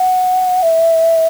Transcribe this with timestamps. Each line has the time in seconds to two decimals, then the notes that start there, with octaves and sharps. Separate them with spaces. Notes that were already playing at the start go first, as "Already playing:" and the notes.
Already playing: F#5
0.63 E5